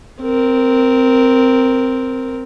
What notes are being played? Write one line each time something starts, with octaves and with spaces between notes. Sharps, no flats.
C4 A#4